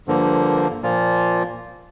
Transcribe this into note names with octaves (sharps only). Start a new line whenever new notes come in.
G2 D3 F3 A#3
A#2 F3 A#3 F4